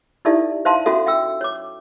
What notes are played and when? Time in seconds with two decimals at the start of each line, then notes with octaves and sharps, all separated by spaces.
0.25 D#4 E4 G4 A4 D5 E5
0.65 C5 E5 F5 A5 C6
0.86 C#4 F#4 A4 E5
1.06 E5 G5 E6
1.41 C#5 D6